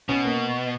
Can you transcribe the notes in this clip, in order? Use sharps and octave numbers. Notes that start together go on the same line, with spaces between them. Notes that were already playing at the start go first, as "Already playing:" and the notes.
B2 C#4
A#3